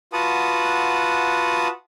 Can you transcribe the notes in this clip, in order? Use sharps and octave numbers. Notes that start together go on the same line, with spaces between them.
F4 F#4 B4 F#5 A5 D#6